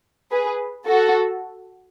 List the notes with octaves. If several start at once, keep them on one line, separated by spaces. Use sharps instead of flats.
G#4 B4
F#4 A4